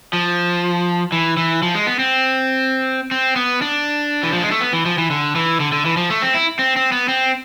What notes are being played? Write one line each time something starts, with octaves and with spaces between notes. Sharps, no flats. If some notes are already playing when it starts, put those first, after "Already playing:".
F3
E3
E3
F3
G#3
B3
C4
C4
B3
D4
E3
F3
G#3
A3
B3
E3
F3
E3
D3
E3
D3
D3
E3
F3
A3
C4
E4
C4
C4
B3
C4